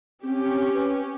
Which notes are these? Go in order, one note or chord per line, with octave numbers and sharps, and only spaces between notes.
C4 C#4 G4
B4